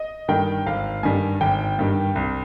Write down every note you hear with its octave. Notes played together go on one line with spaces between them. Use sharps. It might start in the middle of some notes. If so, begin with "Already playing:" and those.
Already playing: D#5
G2 D#3 G3 G5
G#1 F5
G2 D#3 G3 G#5
G#1 G5
G2 D#3 G3
C2